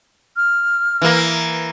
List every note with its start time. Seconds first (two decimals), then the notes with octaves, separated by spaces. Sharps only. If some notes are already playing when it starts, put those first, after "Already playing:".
0.36 F6
1.02 E3 A#3